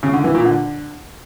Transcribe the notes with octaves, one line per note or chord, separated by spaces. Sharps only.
C#3
D3
E3
A#2
D3